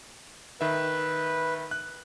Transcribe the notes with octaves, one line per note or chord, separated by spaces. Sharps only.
D#3 B4 E5
F#6